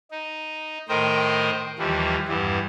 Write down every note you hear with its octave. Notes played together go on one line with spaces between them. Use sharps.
D#4
A2 D#3 A#4 C5 D#5 G5
D#2 E3 F3 G3
E2 G2 E3